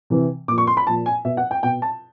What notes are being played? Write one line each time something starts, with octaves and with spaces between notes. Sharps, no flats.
C3 E3
A#2 F3 D6
C#6
C6
B5
A#2 F3 A5
G#5
B2 E5
F#5
G5
B2 G5
A5